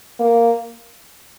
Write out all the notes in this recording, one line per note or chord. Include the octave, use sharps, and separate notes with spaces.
A#3